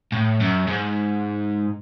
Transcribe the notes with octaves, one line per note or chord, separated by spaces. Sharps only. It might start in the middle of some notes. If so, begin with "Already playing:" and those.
A2
F#2
G#2